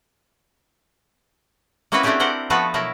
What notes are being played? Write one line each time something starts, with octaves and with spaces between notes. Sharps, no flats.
A#3 C4 C#4 E4 F#4 B4
A3 C4 D4 E4 G4 G#4
G4 A#4 C5 F#5 G5
F3 A3 B3 F#4 A4 B4
B2 F#3 E4 A#4 A5